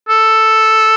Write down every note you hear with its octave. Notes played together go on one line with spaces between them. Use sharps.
A4